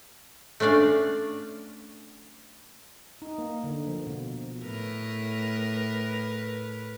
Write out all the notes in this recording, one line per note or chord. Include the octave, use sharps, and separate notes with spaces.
A3 C#4 D4 D5 F5
D#4
A#3
D3
F3
B2
A2 A#4 B4